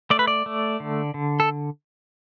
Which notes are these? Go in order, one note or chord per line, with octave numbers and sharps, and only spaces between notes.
A3 D5
B4
D5
A3
D3
D3
A4